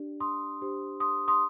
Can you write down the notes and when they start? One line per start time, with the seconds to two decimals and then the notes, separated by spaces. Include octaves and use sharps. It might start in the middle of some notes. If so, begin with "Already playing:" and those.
Already playing: D4 G4 D5
0.20 C6 D#6
0.61 D4 G4 C5
1.00 C6 D#6
1.28 C6 D#6